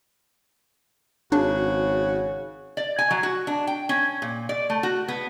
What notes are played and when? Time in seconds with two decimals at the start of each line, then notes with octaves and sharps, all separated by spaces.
1.32 G#1 C#3 D4 F#4
2.77 D5
2.99 G#5
3.11 F#3
3.23 F#4
3.47 D4
3.67 G5
3.89 C#4
4.22 A#2
4.49 D5
4.70 A3
4.83 F#4
5.08 B3